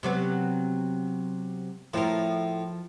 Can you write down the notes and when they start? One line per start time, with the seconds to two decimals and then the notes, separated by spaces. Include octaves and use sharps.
0.03 C3 F#3 B3
1.94 A2 F3 A#4